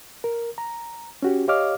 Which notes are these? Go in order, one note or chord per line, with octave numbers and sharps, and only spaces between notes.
A#4
A#5
C#4 F#4 G4
G4 C#5 D#5 F5 D6 F6